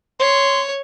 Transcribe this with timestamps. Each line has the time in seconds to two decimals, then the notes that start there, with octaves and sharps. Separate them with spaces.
0.19 C#5 C6